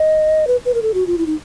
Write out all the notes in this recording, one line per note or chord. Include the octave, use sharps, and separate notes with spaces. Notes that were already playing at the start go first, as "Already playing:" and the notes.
Already playing: D#5
B4
B4
A#4
A4
F#4
F4
E4
D#4